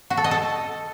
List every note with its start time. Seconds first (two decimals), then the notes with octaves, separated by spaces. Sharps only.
0.10 F#4
0.17 A4
0.24 D#5
0.31 A4